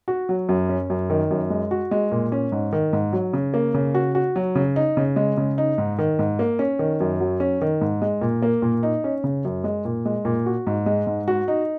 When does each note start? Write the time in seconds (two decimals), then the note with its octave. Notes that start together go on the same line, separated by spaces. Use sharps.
0.08 F#4
0.29 F#3
0.49 F#2
0.69 C#4
0.90 F#2
1.10 D#3
1.31 F#2
1.50 G#3
1.71 F#4
1.91 G#3
2.12 A#2
2.32 C#4
2.52 G#2
2.73 D#3
2.93 G#2
3.13 F#3
3.33 C#3
3.54 A#3
3.74 C#3
3.95 F#4
4.15 F#4
4.36 F#3
4.55 C#3
4.76 D#4
4.97 C#3
5.16 G#3
5.37 C#3
5.58 D#4
5.78 G#2
5.99 D#3
6.19 G#2
6.39 A#3
6.59 C#4
6.79 D#3
7.00 F#2
7.20 F#3
7.40 C#4
7.61 D#3
7.81 G#2
8.02 G#3
8.21 A#2
8.42 A#3
8.62 A#2
8.83 D#4
9.04 C#4
9.24 C#3
9.45 F#2
9.64 G#3
9.85 A#2
10.05 G#3
10.25 A#2
10.46 F#4
10.67 G#2
10.86 G#3
11.07 G#2
11.28 F#4
11.48 D#4